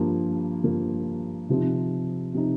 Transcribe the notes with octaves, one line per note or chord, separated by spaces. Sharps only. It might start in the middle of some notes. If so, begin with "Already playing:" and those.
Already playing: G2 F3 A#3
G2 F3 A#3
C3 F3 C4 D#4
C3 F3 C4 D#4